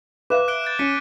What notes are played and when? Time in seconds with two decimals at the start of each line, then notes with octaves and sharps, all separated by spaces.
0.30 B4 E5 F5 D6 F#6 E7
0.48 F#6 D7 G7
0.64 F#6 G6 A6
0.79 C#4 B6 C#7 D#7